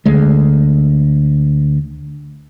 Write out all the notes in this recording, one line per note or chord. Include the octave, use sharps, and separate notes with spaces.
D2 G#3